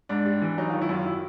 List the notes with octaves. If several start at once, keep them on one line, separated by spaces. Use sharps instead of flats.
G#2 D4
G3
E3
F#3 D#4
D#3 F4
E4
F#2 F4
E4